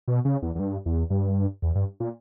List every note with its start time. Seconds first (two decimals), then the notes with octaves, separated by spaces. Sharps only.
0.08 B2
0.25 C#3
0.42 E2
0.55 E2
0.59 G2
0.86 E2
1.10 G2
1.62 E2
1.75 G2
2.00 A#2